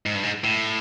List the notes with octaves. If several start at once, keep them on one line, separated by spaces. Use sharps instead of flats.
G#2
G2
G#2
A2